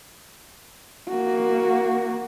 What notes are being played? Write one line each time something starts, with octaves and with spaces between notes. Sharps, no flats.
A#3 F#4